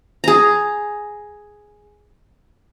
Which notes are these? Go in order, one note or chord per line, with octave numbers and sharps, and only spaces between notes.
G#4 A#5